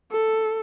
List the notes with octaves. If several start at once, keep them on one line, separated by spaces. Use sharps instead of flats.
A4